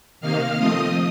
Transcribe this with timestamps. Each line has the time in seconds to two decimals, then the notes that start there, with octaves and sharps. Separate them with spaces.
0.21 C3 D#3 A#3 D#4 F5 F6
0.57 F3 A3 C4 D#5 D#6